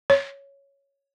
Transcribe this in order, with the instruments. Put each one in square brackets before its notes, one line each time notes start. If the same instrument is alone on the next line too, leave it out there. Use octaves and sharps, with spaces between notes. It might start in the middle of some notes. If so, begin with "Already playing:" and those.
[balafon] C#5